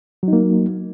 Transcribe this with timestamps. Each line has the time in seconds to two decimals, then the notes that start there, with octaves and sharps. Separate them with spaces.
0.23 F#3
0.28 D#4
0.33 A#3